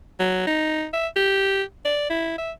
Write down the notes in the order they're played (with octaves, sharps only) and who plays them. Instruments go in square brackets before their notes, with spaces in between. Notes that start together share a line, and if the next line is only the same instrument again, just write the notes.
[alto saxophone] F#3
D#4
E5
G4
D5
E4
E5